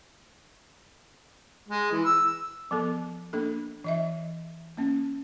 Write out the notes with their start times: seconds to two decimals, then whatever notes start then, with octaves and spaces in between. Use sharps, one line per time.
1.68 G#3
1.91 E3
2.05 E6
2.71 F3 B3 A4
3.33 A#3 D4 A4
3.84 E3 D#5 E5
4.77 A#3 C#4